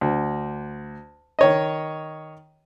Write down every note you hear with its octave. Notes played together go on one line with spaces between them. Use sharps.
D2
D#3 C#5 D#5